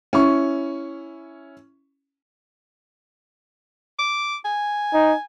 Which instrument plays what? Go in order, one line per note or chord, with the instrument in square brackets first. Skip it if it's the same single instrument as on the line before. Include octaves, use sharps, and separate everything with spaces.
[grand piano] C#4 E4 C#6
[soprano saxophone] D6
G#5
[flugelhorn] D#4